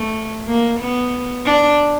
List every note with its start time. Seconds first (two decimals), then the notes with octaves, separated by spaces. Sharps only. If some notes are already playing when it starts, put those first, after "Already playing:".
Already playing: A3
0.47 A#3
0.80 B3
1.45 D4